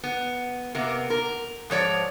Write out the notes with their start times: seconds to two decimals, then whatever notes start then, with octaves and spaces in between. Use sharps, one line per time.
0.04 B3
0.75 C3 A#3 B3
1.10 A#4
1.70 G#2 F3 C#5 D5